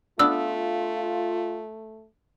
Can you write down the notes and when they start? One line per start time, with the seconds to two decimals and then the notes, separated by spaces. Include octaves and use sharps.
0.19 A3 B3 D4 F4 E6